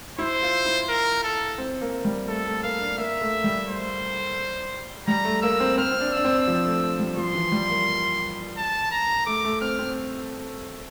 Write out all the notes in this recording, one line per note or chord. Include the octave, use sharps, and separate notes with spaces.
E4 C5
F4
E4
A#4
A4
C4
A#3
G3
A3 A4
A3
A#3 F5
D4
A#3 E5
A3
G3
C5
G3 A#5
A3
A#3 E6
C4
C4 F6
C4
D4
D4 E6
C4
F3
A3
G3
F3 C6
E3
G3
A#3
A5
A#5
A3 D6
A3
C4 F6
C4